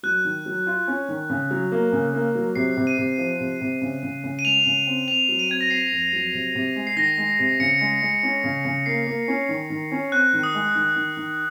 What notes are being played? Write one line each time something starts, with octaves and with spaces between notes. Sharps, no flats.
F#3 F#6
D#3
F#3
F4
C#4
D#3
C#3
F#3
A#3
C#3
A#3
F#3
C3 C7
C3
D#7
C3
F3
C3
C3
C#3
C#3
C#3
D#7
G#3 F7
C#3
C4
C4 F7
F#3
D#7
C4 G#6
A#6
C4 C7
F2
F#3
C3
C3
G#3
C7
D#3 A#6
G#3
C3
C#3 C#7
G#3
G#3
C#4
C#3
C#3
A#3 C7
A#3
C#4
D#3
D#3
C#4
C4 F#6
D#3
D#6
G#3
D#3
D#3
D#3